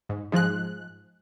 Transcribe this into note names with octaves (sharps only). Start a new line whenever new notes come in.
G#2
G#2 F3 G#3 F#6